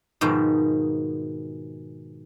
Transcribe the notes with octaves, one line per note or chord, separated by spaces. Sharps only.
G#2 B2 D#3 F3